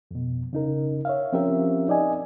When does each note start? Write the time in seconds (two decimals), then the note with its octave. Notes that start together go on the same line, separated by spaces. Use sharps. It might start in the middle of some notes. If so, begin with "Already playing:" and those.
0.11 F2 B2
0.53 C#3 D#4 A#4
1.05 C#5 E5 F5
1.33 F3 C4 C#4 G4 A#4 E5
1.88 D#4 D5 D#5 G#5